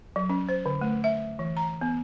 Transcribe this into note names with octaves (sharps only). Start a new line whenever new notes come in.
F#3
C#4
C5
D3
A3
E5
E3
A#5
B3